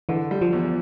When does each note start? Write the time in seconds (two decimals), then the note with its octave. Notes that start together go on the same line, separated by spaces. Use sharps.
0.09 D3 E3
0.31 G3
0.41 F3
0.53 E2